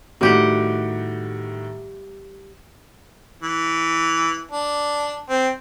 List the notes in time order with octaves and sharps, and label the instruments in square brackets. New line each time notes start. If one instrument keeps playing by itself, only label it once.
[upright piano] A2 D#3 F#4 [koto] G3 G4 F#5
[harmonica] E3
D4
C4